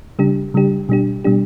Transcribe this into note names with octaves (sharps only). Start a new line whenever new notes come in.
C#3 G3 D4 G4
C#3 G3 D4 G4
B2 G3 D4 G4
B2 G3 D4 G4